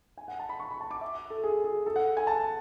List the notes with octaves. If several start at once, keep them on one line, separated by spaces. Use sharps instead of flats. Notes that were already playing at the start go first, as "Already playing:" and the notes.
G#5
F#5
A5
B5
C#6
B5
A5
D6
E5
A4
G#4
G#4
A4
F#5
G#5
A5